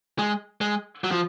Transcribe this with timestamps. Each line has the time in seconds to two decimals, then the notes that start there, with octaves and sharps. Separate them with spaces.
0.19 G#3
0.61 G#3
1.04 F#3
1.11 F3